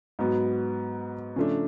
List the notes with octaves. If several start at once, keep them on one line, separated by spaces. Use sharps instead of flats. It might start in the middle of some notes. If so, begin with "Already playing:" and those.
G#2 F#3 B3 F#4
C#3 F3 A3 D4